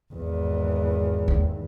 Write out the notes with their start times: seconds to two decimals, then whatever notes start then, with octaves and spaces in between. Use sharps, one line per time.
0.14 G#1 E2
1.28 D#2